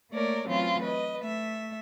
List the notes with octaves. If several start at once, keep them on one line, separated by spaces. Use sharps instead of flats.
A3 A#3 A#4 C#5 D5
E3 F#3 A3 C4 C#4 F4
B4 D#5
A3 E5